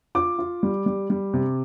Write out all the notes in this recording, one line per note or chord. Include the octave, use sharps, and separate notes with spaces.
F4 D6
F4
G3
G3
G3
C3